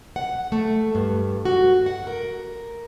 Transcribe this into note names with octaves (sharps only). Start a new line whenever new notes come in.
F#5
A3
G2
F#4
F#5
A#4